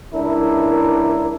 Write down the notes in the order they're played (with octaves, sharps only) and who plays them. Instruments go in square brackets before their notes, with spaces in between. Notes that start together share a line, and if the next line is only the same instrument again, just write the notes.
[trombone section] C#2 D4 E4 A#4